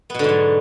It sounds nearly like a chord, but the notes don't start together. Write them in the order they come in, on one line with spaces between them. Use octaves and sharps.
B3 B2 D3 G#2 F#3